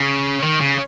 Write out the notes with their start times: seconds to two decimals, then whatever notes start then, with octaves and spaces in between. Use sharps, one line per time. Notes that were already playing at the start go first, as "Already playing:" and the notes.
Already playing: C#3
0.43 D#3
0.60 C#3